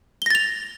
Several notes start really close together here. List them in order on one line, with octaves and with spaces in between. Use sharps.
G7 A#6 A6 F7